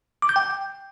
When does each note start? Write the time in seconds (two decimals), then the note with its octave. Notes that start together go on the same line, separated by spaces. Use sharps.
0.22 D6
0.29 G6
0.36 G5